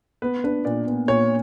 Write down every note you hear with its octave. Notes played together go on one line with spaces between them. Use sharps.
B3 B4
D4 B4
A#2 D5
B3
A#2 C#5